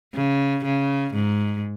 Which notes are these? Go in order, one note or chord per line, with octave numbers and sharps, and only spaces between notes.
C#3
C#3
G#2